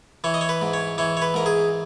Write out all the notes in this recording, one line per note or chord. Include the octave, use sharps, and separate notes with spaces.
E3 C#5
D#5
C#5
B4
G#2
C#5
E3 C#5
C#5
B4
G#2 A#4
G#4